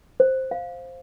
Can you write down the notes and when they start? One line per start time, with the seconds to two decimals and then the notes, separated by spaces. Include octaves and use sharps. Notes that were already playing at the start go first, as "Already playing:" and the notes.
0.20 C5
0.51 F5